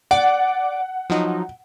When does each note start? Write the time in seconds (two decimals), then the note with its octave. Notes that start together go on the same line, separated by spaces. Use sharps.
0.11 D5 F#5 D6
1.10 F3 F#3 D#4